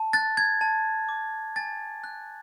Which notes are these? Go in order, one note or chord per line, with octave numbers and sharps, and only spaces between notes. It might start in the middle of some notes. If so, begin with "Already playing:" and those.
Already playing: A5
F#6 A6
G#6
A5
D6
G#5 A6
F#6